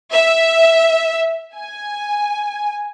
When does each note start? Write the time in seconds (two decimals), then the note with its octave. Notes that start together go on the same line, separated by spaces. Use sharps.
0.14 E5
1.56 G#5